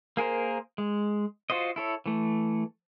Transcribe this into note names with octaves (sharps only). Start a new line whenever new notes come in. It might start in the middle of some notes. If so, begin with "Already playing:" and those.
A#3 G#4 A#4 C5
G#3
F4 F#4 C5 D#5
E4 A4 C#5
E3 A3